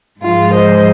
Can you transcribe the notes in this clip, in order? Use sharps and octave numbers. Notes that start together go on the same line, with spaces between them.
G#2 F3 G#3 F4
C5 D#5